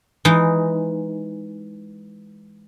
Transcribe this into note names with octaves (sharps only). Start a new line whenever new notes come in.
E3 G#3 D#4